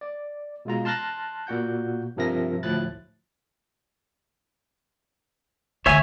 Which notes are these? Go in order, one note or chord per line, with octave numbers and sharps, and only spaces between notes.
D5
B2 G#3 F4 A#5
A5 C6 F6 F#6 A6 A#6
A#2 F#4 F#5 G6
G2 C3 F3 A#4 E5 A#6
D2 A2 F3 E4 F#6 A6
D2 C#5 E5 G#5